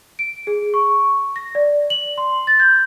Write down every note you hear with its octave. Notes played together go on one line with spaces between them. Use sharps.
D7
G#4
C#6
A#6
D5
F#7
C6
A6
G6